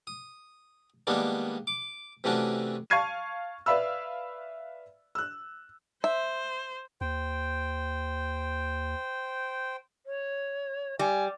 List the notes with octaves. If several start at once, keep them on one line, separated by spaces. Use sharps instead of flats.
D#6
D#3 G3 G#3 A#3 B3 D4
D6
C3 E3 A3 C#4 D4 F#4
F5 A5 C#6 G#6 C7 D#7
B4 D5 E5 F5 B5 E6
E6 F#6
C5 E5
D#2 C5 G5
C#5
G3 G#5